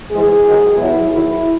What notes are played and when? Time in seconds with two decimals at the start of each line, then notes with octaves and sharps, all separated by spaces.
0.11 G#2 E3 G#4
0.44 G#2 D#3 F#3
0.76 E2 B2 F#3 E4
1.09 E2 D#3 F#3 E4